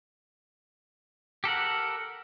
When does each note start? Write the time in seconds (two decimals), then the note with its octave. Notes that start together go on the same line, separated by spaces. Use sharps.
1.44 G4 A4 A#4 F#5